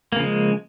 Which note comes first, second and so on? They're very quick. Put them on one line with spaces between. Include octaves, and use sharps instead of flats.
A#3 C#3 F3 G#3